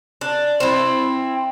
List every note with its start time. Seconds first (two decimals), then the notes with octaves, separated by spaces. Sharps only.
0.21 D4
0.60 C4 E4